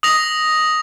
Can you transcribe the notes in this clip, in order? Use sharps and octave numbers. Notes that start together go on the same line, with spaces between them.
D#6 A#6 F7